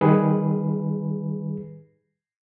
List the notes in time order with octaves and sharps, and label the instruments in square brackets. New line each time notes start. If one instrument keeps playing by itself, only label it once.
[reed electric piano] D#3 G3 G#4 B4